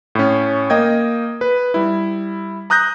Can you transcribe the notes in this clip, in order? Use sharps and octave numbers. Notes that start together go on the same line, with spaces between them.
A2 C#4
A#3 D#5 G5 D#6 G#6
B4
G3 E4
A#5 D#6 F#6 G6 A#6